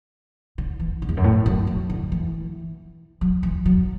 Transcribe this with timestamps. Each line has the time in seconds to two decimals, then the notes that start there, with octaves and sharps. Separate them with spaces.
0.58 D3
0.80 E3
1.02 D3
1.09 E2
1.17 F#2
1.24 A2
1.46 F#2
1.67 F#2
1.90 D3
2.12 E3
3.21 F#3
3.43 E3
3.65 F#3